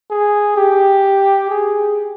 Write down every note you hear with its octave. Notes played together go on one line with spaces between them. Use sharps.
G#4
G4
G#4